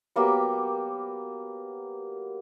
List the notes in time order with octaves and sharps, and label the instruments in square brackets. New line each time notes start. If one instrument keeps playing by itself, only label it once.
[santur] F#3 A#3 B3 G4